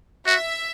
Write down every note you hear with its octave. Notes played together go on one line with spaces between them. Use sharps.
F#4 E5